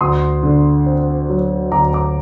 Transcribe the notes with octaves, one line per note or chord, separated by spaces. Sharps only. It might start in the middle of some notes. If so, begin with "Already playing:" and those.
D2 C6 D#6
D3
C4
F#3
D2 A#5 D6
A#5 D6